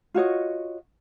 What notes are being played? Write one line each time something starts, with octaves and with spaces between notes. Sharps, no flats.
F4 F#4 C#5 D#5